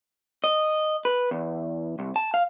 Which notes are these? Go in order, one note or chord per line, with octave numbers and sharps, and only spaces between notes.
D#5
B4
E2
C2
A5
F5